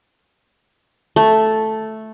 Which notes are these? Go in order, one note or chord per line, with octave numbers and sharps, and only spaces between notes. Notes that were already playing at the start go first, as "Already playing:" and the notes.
A3